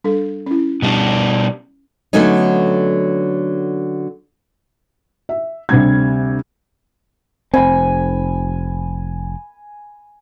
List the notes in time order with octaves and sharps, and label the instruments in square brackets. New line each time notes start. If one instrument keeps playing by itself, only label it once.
[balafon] G3 D4 A4
C#4 E4
[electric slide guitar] B2 G3 D4
[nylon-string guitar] D3 F#3 A3 B3 C#4 D#4
[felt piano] E5
D2 C3 G3 G#6
[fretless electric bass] F1 C4 [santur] G#5 B5